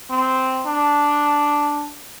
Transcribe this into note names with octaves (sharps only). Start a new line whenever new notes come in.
C4
D4